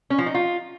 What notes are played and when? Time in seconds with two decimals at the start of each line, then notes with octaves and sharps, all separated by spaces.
0.10 C#4
0.18 F3
0.26 D#4
0.34 F4